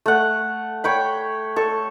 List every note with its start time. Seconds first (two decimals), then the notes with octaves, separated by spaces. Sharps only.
0.06 A3 F#5
0.84 C#5 G5 B5
1.56 A4 C#6